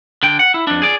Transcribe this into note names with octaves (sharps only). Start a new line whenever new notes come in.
D3 G5
F#5
E4
F2 D4
G#4 D5